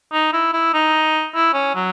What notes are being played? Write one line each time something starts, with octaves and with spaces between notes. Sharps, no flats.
D#4
E4
E4
D#4
E4
C#4
F#3